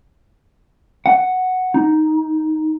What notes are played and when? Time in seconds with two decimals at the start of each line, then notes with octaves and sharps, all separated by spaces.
1.06 F#5
1.74 D#4